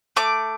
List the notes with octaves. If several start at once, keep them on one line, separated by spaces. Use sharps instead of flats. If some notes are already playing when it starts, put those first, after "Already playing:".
A3 D6